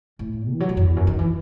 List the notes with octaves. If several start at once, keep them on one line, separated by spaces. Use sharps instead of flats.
A2
E3
F#3
G#2
F#2
E2
F#2
D#3
E3